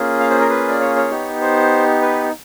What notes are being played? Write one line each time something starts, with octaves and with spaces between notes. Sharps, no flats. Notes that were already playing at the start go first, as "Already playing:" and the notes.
Already playing: A#3 C#4 F4 G#4
F5
C5
A#4
B4
D5
C#5
C#5
B3 D#4 G4
C5
B4